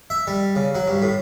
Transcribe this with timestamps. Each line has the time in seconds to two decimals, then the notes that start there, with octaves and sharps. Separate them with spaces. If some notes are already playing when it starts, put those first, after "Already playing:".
0.10 E5
0.27 G3
0.55 C#3
0.75 F#3
0.88 G2
1.02 A2